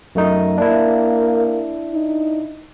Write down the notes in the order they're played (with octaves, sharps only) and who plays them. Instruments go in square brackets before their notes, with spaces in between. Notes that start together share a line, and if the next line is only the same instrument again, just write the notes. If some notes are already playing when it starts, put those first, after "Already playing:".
[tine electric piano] F#2 A3 D#4
[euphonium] A#3 [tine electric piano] D4 E4
[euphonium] D#4